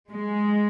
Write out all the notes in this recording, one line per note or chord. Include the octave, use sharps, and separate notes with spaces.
G#3